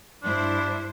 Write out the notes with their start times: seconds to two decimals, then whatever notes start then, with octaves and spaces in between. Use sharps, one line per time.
0.23 G2 D4 E4 C5